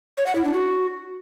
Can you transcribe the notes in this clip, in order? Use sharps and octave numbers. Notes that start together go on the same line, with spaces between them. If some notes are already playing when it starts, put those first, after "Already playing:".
C#5
F#5
E4
D4
F#4